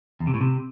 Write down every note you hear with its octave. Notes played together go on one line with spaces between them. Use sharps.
E2
C3
A2
C3